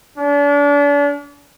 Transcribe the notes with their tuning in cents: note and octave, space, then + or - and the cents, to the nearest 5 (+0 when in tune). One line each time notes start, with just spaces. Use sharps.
D4 -40